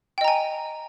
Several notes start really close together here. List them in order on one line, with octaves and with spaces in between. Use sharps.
G5 D#5 A#5 G#5